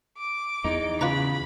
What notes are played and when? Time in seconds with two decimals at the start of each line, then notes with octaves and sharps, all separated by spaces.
0.18 D6
0.64 E2 D#4
1.01 C#3 F4 B4 A#5 B5